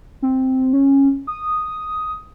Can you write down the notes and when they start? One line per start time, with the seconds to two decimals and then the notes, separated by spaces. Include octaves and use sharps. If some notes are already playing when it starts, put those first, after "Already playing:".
0.22 C4
0.73 C#4
1.27 D#6